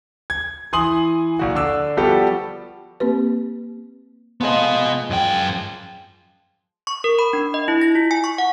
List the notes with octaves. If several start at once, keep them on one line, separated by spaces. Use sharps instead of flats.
G#6
E3 G#5 C6 D#6 F#7
A#1 F#4
D3 D6 E6
F3 G3 B3 F#4 G4 A4
A#3 C4 G4 B4
F3 G#3 B3 D#5 G#5
F#2 G5
C#6
A#4
B5
D4
D#5
E4
A#6
F4
G#5
C#6
F#5